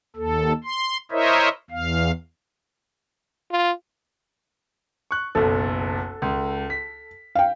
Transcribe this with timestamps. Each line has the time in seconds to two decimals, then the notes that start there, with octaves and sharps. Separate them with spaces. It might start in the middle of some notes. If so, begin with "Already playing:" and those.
0.16 D#2 A4
0.64 C6
1.11 E4 A#4 C5 C#5 D#5 E5
1.71 E2 F5
3.51 F4
5.11 C#6 F#6
5.35 F#1 B1 A4
6.22 C#2
6.70 B6
7.35 F5 G5